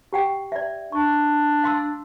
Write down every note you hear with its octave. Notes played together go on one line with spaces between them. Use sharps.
G4 F#5 G5
D5 E5
D4 C#6
F5 C6 E6